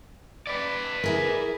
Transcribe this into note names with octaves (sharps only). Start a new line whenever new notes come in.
B4 D5
E4 G#4 A#4